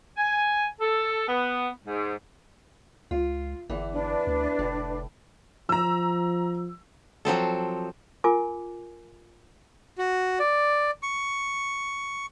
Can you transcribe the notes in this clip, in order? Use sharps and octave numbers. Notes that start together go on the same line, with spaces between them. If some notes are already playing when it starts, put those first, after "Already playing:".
G#5
A4
B3
G#2
C#2 F4
G1 E2 E3
D4 B4
D2
F1 A2
F3 A#5 E6
F3 F#3 C4 A4
F4 A#4 G#5 D6
F#4
D5
C#6